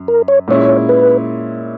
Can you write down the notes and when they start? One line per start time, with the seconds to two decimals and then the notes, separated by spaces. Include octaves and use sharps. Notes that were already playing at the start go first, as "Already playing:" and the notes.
Already playing: F#2
0.08 A#4
0.28 C#5
0.48 A#2 G#3 C#4 E4 C#5
0.89 B4